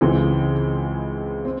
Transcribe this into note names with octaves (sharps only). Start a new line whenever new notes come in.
C#2 C#3 E3 G#3 C4
C4